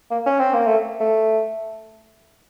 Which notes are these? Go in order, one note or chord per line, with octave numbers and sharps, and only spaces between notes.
A#3
C#4
C4
A#3
A3
A3